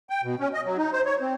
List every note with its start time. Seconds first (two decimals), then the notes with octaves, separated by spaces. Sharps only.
0.10 G5
0.24 B2
0.39 C#4
0.54 D#5
0.65 F#3
0.77 D#4
0.92 C5
1.05 C#5
1.21 C4